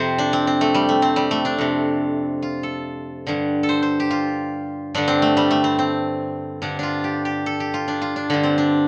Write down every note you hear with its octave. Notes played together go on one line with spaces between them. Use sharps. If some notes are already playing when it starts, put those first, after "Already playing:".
Already playing: F2 C3 C5
D4
C4
C4
A3
G3
A3
C4
G3
A3
D4
F2 C3
F4
A4
G2 D3
A4
C5
C5
G4
F4
G2 D3 D4
C4
A3
G3
A3
C4
C4
G2 D3 D4
D4 F4
G4
G4
A4
G4
F4
D4
F4
D4
G2 D3 F4
C4
D4